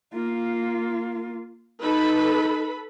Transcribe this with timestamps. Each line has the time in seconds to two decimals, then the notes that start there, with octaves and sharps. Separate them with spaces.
0.14 A#3 F4
1.82 D#4 A4 B4 B5